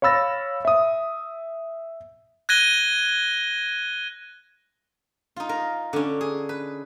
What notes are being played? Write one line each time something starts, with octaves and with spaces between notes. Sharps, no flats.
C#5 F5 B5 E6 A6 A#6
E5 D#6
F#6 G#6 A#6 D#7 G7
D#4 F4
A#4
D3 C#4
G#4
B4